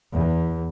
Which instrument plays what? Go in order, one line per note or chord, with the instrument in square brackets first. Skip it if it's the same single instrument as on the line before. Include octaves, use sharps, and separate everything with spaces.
[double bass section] E2